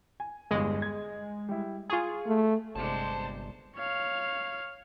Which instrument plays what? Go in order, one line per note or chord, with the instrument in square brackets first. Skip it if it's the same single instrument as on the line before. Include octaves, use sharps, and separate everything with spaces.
[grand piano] G#5
[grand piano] G1 E2 G2 [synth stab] G#3
[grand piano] G#6
G3 E4
[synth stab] F4 G#4 [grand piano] G#5 C#6
[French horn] A3
[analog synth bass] G1 [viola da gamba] C3 G#3 D4 [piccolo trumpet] C5 [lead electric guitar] A5
[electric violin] C#5 F5